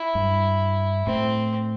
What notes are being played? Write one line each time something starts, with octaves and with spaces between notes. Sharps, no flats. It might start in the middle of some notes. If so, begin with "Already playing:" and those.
Already playing: E4
G2
A2 C4